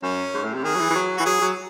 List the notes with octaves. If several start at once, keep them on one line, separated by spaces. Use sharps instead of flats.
F#2 C#4
G#2
A2
C3
D#3 G#4
F#3
E3
E3
F#3
E3 F#4
F#3 G#4
F#3